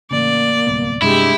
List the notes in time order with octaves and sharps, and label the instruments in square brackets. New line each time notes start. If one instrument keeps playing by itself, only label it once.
[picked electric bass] A1 C#3 [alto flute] A#3 [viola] D5
[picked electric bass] D1 C2 B3
[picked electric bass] G2 C3 A3 [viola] G#3 G4 [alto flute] D4 [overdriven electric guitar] E4